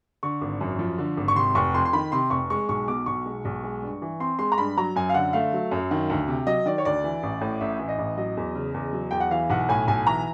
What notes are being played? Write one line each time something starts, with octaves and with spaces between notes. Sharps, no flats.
D3 C#6
G#1
F#2
F3
D3
G#1
C#6
C3 C6
F1 C#6
F2 C6
C6
D#3 B5
C3 C6
F1 C#6
G#3 C#6
B1 C#6
B2 D6
B1 C#6
G#3
B1
G#3
G2
E3
C4 C6
G#3 C6
A#5
G2 B5
F#3 A#5
F#2 G#5
F5
D3 F#5
A3 F5
F#3
F#2
D#3
D2
C3
F#3 D#5
D#3 D5
C#5
D2 D5
E3
A1
A2
A1 E5
E3
D#5
A1
F#3 D#5
E2
C#3
E2
F#3
E2 G5
F#5
E3 F5
B1 F#5
A2 G#5
B1 G#5
E3 A#5